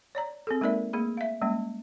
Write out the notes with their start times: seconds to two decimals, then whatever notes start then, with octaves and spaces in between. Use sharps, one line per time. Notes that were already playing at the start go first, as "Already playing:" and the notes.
0.15 C#5 D5 A#5
0.47 C4 G#4 A4
0.61 G#3 A#3 D#4 A#4 D5 E5
0.93 A3 A#3 G#4 B5
1.17 E5 F5
1.41 G3 G#3 A#3 C#4